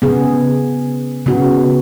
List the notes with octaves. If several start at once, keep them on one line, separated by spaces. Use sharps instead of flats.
C#3 B3 G#4
C#3 B3 F#4